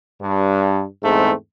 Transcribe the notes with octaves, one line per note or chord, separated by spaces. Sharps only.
G2
E2 G#2 A3 C4